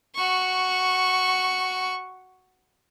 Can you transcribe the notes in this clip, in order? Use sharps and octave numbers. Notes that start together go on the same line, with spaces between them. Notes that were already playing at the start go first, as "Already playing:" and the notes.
F#4 C#6